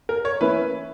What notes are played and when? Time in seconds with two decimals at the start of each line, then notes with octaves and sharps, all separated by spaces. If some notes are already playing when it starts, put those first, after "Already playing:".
0.09 A#4
0.25 C#5
0.41 E3 A#3 C#4 E4 B4